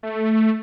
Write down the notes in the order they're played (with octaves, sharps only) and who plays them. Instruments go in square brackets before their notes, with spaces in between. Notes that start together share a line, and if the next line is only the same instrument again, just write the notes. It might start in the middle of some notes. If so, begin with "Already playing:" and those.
[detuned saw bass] A3